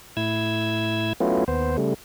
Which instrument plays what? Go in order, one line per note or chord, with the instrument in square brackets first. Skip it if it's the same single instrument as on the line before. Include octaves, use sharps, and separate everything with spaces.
[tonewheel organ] A2 E4 E6 G#6
F#3 A3 B3 C#4 E4 F4
D#2 B3 C5
C#3 G3 A3